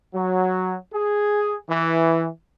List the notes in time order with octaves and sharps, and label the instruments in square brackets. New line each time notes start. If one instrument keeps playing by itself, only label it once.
[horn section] F#3
G#4
E3